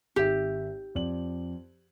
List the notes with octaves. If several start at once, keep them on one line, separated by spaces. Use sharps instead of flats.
G#1 G4 E5
F2 D5 F#7